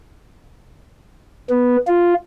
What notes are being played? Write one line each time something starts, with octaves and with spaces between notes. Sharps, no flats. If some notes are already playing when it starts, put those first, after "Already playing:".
B3
F4